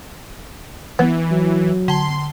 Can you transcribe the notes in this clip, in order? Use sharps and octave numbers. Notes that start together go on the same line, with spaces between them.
E3 B3
F#3
D3 A5 C6 G7